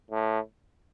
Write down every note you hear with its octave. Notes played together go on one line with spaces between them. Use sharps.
A2